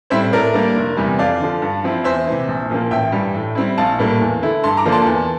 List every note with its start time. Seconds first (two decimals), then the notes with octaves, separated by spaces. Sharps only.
0.10 A2 G3 C4 E4 C5 E5
0.32 A2 A#4 D5
0.54 G3 A#3 D4
0.76 F1
0.97 E2 C3 E3 G3
1.18 F2 D5 F5
1.40 D3 F3
1.62 G2
1.84 F3 C4 E4
2.04 E2 C5 E5
2.27 C3 E3
2.48 A#1
2.70 A#2 F3 A#3
2.91 A1 E5 G5
3.12 G2 E3 G3
3.34 A2
3.55 G3 C4 E4
3.78 A#1 F5 A5
3.99 A2 G3 A#3
4.20 E2
4.41 D3 A3 E4
4.63 G2 A5 C6
4.77 A#5 D6
4.85 D3 F3 A#3 D4
4.92 A5 C6
5.06 E2